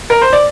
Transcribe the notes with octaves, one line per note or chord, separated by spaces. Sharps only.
A#4
C5
D5